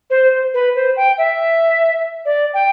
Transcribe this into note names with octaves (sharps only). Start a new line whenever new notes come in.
C5
B4
C5
G5
E5
D5
G5